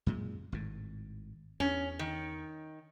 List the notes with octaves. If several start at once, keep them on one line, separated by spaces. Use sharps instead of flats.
F#2 A#2 G#3
G#1 A2
E2 C#4
D#3